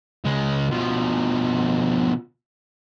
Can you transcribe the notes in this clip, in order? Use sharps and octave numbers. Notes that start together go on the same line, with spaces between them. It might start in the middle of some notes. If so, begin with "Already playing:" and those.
C#2 G#3
B2 F3